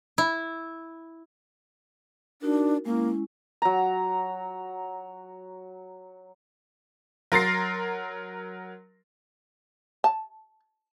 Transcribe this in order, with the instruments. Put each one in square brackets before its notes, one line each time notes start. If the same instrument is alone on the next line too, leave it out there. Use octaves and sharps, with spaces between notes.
[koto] E4
[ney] D4 [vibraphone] D#4 F#4 A#4
[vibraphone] G#3 C#4 E4 [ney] A#3
[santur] F#3 A#5
[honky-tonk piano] F#3 A#4 C6 A6 A#6 C7
[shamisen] A5